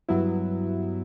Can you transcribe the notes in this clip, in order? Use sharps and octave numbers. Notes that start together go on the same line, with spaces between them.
G2 F#3 B3 E4